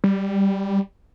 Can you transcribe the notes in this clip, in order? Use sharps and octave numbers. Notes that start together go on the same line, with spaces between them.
G3